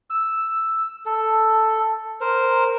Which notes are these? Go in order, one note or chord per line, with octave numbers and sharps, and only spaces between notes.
E6
A4
A#4 C5